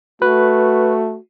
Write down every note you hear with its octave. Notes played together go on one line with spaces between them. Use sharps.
A3 F#4 B4